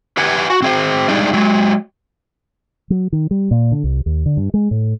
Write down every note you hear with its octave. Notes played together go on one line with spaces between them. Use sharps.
G4 B4 F#5 G#5
F#4
C4 G#4 C5
G3 G#3 D4 D#4
F#3 G#3
F#3
D#3
G3
A#2
D3
C2
D#2
D3
G2
G#3
A2